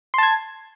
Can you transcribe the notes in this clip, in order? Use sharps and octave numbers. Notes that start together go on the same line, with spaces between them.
A5 C6 G#6